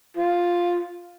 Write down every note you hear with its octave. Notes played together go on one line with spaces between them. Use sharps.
F4